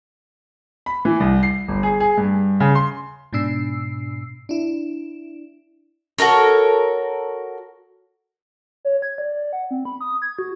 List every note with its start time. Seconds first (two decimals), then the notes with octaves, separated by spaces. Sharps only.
0.86 B5
1.05 E3
1.20 C2
1.43 C7
1.68 G1
1.83 G#4
2.00 G#4
2.17 G2
2.60 C#3
2.75 C6
3.33 G#2 B2 D4 E6 C7
4.49 D4 E4
6.18 F#4 A4 A#4 C#5
8.85 C#5
9.02 G#6
9.18 D5
9.53 F#5
9.71 C4
9.85 B5
10.01 D#6
10.22 G#6
10.39 F#4